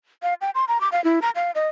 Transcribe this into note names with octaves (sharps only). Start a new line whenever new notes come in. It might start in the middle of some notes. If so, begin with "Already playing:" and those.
F5
G5
C6
A#5
D6
F5
E4
A#5
F5
D#5